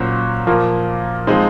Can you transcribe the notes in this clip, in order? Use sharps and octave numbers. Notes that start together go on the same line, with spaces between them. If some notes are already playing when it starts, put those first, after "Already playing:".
Already playing: A#2 F#3 C#4 F#4 C5
A#2 F3 A#3
F3 G#3 C4 D#4